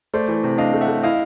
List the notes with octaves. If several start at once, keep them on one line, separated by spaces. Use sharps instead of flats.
A3 C5 D5
E3
C3
D4 D#5 F5
A3
E5 F#5
A3
E4 D#5 F5